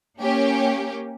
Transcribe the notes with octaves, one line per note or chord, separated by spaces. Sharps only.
A#3 C#4 G4